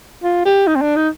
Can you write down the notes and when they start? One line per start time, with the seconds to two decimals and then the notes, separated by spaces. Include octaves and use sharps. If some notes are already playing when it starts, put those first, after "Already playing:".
0.23 F4
0.45 G4
0.67 D#4
0.76 C4
0.81 D4
0.96 D#4